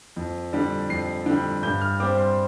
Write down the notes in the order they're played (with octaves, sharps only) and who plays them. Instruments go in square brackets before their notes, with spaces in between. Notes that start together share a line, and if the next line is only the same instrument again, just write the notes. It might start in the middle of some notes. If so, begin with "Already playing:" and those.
[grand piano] F2
D3 G3
F2 C7
D3 G3
G2 G6
F6
G3 C4 D6
C6